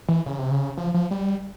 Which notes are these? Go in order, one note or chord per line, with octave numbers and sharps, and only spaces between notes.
E3
C#3
C3
C#3
F3
F3
G3